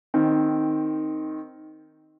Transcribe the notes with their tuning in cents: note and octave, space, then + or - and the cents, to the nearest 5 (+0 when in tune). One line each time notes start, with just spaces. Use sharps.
D#3 +0 C4 +0